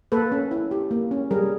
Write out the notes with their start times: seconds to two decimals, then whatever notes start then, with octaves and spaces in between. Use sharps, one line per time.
0.12 A#3 A4 B4
0.32 C#4
0.51 E4
0.71 G4
0.91 A#3
1.11 C#4
1.31 G3 G#4 A#4